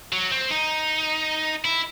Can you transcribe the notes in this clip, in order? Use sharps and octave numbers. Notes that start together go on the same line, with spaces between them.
F#3
C4
D#4
E4